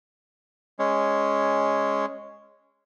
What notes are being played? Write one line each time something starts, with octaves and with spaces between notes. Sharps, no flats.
G#3 C#4